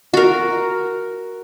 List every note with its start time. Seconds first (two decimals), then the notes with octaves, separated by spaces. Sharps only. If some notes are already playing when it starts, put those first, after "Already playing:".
0.14 F#4 A#4